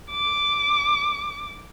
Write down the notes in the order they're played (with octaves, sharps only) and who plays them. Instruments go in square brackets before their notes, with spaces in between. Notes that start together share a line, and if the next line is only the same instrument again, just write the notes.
[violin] D6